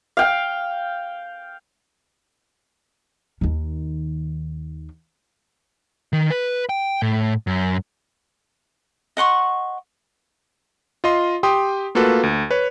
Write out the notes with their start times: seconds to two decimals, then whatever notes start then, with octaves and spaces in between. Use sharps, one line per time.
0.17 F5 G5
3.41 D#2 D#3
6.13 D#3
6.31 B4
6.69 G5
7.02 A2
7.47 F#2
9.17 D#5 F#5 C6 C#6
11.04 F4 D#5 C6
11.43 G4 G5 C6 D#6
11.95 A3 A#3 F4 F#4 A4 B4
12.23 D2
12.51 B4 C#5